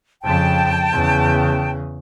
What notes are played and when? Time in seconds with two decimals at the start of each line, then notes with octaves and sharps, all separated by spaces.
0.23 F2 C#3 G5 A5
0.92 E2 C#3